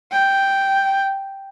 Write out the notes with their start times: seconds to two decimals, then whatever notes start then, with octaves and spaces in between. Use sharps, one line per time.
0.12 G5